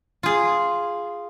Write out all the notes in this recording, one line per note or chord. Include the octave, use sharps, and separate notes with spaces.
F4 G#4